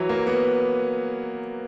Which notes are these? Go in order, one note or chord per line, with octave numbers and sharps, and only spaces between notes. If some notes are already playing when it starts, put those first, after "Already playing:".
Already playing: E3 F#3
A#3
B3